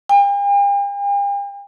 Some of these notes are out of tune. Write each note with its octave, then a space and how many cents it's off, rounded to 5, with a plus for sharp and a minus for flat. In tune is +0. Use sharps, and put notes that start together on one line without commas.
G5 +45